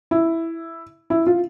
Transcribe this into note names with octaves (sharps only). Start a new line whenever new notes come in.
E4
E4
F4